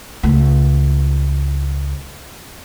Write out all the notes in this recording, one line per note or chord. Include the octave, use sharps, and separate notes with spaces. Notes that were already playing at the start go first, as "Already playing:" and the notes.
C#2 A3